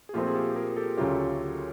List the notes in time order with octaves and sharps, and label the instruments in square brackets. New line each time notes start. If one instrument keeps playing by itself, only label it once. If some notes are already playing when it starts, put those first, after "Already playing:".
[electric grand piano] G#4
[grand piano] A#2 F3 A3 C4 [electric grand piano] F4 G4
[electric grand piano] G#4
G4 A4
G#4 A#4
G4 A4
[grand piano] D2 C#3 F#3 A3 C#4 [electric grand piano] F4 G4